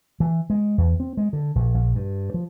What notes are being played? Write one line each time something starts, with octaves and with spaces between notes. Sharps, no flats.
E3
G#3
E2
C4
G#3
D3
A#1
A#1
G2
F3